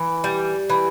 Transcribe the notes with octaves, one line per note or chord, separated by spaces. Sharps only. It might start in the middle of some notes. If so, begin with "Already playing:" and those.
Already playing: E3
G3
E3